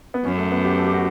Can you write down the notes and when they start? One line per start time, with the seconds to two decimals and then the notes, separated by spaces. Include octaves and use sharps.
0.14 B3
0.25 F#2 C#4
0.38 A3
0.52 B3
0.64 G4
0.78 A4
0.86 G4
0.94 F#4